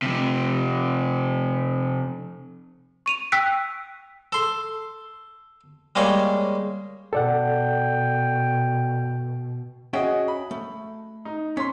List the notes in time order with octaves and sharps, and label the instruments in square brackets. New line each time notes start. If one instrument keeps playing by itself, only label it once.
[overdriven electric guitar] C3 F3
[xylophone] C#6 D#7 F7
G5 E6 F#6 B6 D7
[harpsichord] A4 C6
G3 G#3 A#3 G#4 C#5
[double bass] B2 [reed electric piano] A4 D5 F#5 [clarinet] G5
[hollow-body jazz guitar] C#4 E5 G5 [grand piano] F#4 G#4 D#5
[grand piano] B5
[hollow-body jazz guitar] A3
[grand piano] D#4
[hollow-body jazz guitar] C#4 [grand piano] C6 B6